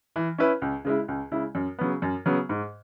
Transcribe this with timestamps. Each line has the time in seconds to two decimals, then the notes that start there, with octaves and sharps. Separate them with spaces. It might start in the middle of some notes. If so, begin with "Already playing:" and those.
0.16 E3
0.38 C#4 E4 B4
0.62 C#2
0.85 C#3 G#3 E4
1.08 C#2
1.32 C#3 G#3 E4
1.55 F#2
1.79 C#3 F#3 B3
2.02 F#2
2.26 C#3 F#3 B3
2.49 G#2